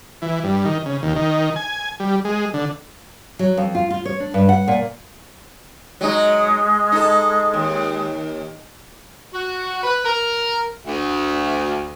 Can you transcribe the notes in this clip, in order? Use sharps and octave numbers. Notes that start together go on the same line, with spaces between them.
E3
G2
D#3
C#3
D#2
D#3
G#5
G3
G#3
D3
F#3
F2
F4
F4
C#5
D4
G2
F#5
A#2
F#3 G#3 D#4
D#4 A4
D#2
F#4
B4
A#4
D2